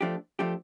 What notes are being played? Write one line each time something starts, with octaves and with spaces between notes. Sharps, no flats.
F3 A3 D4 G4
F3 A3 D4 G4